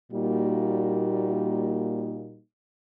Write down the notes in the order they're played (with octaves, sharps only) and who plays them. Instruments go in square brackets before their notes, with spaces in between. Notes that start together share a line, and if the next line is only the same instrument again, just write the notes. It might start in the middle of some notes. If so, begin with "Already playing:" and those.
[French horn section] A#2 G3 A#3 D#4 F#4